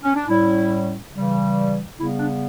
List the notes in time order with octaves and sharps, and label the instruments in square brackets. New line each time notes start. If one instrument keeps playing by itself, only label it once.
[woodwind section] C#4
D4
A2 G3 C#4 E4
C#3 E3 G3
C#3 G3 B3 E4
D4